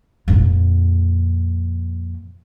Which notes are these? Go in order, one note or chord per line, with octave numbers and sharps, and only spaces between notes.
F2 A#2